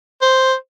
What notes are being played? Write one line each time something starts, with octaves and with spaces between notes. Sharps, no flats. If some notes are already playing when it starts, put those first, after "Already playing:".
C5